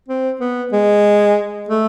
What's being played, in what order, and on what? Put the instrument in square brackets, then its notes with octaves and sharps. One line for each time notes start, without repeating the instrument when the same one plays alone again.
[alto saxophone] C4
B3
G#3
A3